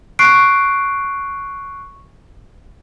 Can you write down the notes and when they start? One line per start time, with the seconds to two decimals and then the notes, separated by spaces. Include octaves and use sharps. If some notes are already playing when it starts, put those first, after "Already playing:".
0.19 C#6 F#6 C7 D7